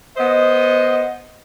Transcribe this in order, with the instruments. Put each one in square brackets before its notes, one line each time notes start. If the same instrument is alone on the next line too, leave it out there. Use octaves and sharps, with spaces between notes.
[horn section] B3 C5 D#5